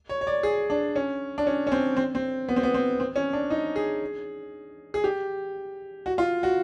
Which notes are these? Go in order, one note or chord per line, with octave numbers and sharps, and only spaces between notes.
C#5
C#5
D5
G#4
D4
C#4
D4
C#4
C#4
C4
C4
C4
B3
C4
B3
C4
C4
C#4
D4
D#4
G#4
G#4
G4
F#4
F4
F#4